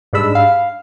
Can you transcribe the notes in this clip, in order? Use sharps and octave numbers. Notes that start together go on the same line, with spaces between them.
G#2 G3 G#3 D4 B5 E6
F5